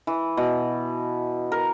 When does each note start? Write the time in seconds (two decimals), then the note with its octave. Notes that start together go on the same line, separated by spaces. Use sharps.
0.07 E3
0.37 B2
1.52 A#4